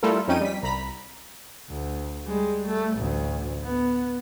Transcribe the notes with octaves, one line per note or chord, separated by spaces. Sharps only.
G3 A3 E4 F4 A4 A#4
F2 F3 C#4 D#4 G5 D#7
G3 B6
C2 A#5 B5 B6
D2
G3 G#3
A3
A1 D2
B3